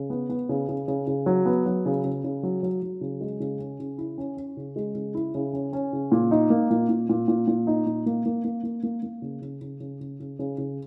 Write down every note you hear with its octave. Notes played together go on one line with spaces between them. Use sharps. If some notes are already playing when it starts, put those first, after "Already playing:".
Already playing: C#3
B3
B3
C#3
C#3
C#3
C#3
F#3
B3
F#3
C#3
C#3
C#3
F#3
F#3
F#3
C#3
G#3
C#3
C#4
C#3
E4
C#4
C#4
C#3
G#3
C#3
E4
C#3
C#4
C#4
C#3
A#2
D#4
A#3
A#2
A#2
A#2
A#2
A#2
D#4
A#2
A#3
A#3
A#3
A#3
A#3
A#3
C#3
C#3
C#3
C#3
C#3
C#3
C#3
C#3